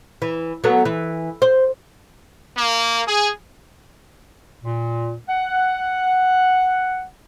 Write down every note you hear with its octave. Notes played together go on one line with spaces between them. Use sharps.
E3
F#3 A3 B3
E3
C5
A#3
G#4
A#2
F#5